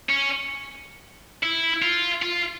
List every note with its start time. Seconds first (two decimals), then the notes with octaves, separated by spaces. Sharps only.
0.10 C#4
1.43 E4
1.82 F4
2.22 F4